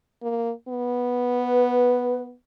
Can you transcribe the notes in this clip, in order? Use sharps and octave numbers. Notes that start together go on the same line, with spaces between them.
A#3
B3
B4